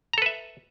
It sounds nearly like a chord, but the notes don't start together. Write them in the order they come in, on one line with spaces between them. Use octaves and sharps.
A#5 A4 B4 E5